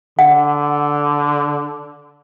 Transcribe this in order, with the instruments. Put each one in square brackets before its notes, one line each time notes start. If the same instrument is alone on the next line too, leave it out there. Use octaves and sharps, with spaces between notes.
[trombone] D3 [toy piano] F#5